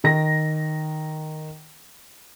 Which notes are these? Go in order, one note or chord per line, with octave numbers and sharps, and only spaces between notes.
D#3 A#6